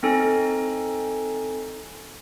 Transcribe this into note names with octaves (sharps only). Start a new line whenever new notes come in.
C4 D#4 A4 G#5